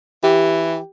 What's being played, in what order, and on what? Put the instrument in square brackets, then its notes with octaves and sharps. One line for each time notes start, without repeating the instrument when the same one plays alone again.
[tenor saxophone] E3 [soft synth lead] G4